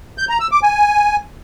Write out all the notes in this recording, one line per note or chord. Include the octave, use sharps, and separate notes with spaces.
G6
A#5
E6
D6
G#5